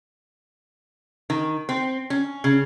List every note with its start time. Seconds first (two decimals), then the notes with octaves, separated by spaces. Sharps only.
1.30 D#3
1.69 C4
2.10 C#4
2.44 C#3